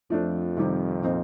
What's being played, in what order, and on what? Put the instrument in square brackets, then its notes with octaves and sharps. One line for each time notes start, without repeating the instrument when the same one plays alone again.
[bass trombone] F2 [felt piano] F3 A3 D4
[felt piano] C3 D#3 G3
A#2 F3 C4 D#4